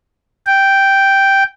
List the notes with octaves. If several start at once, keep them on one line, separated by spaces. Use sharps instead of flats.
G5